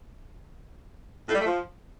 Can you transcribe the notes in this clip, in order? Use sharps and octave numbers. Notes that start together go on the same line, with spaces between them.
A2
G3
A3
F3